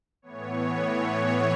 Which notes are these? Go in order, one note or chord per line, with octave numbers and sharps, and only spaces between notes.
A2 E3 B3 C#5
C#5
A2 E3 B3 C#5